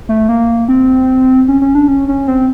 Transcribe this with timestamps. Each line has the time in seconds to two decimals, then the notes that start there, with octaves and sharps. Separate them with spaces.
0.09 A3
0.29 A#3
0.68 C4
1.48 C#4
1.61 C#4
1.75 D4
1.88 C#4
2.08 C#4
2.28 C4